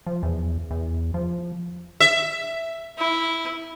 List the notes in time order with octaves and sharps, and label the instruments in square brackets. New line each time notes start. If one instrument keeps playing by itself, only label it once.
[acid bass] F3
E2
E2
F3
[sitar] E5
[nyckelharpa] E4